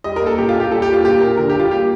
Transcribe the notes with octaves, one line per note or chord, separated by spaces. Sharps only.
G3 D#5
A#4
A#3 A4
A#2 G4
F4
A#2 G4
G3 A4
G4
A#3
F4
A#2 G4
A#2 A#4
D3 A#4
G4
G3 F4
A#3 G4